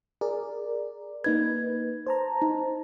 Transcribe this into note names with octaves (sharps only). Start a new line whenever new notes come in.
G#4 A#4 D5
A#3 D#4 B4 G#6
C5 A5 A#5
D#4